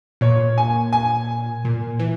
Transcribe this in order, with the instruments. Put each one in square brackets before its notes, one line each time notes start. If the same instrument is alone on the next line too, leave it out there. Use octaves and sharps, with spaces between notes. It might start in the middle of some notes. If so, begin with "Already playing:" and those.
[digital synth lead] A#2 [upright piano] C#5
[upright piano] G#5
G#5
[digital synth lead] A#2
E3